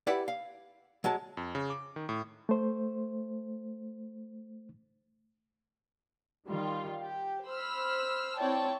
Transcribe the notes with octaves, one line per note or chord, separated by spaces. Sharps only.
E4 G4 B4 D5 E5 F#5
F5
F#3 G#3 A5
F2
C#3
D6
D#3
A2
A3 C5
D#3 G3 F4
G4
C5 B5 E6 F6
C4 E4 C#5 D5 G5 A5